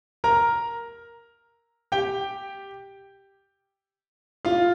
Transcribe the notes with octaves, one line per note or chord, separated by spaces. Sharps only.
A#4 A#5
G4 G5
F4 F5